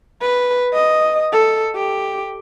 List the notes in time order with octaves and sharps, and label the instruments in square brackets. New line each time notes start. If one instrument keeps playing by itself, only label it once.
[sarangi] B4
D#5
A4
G4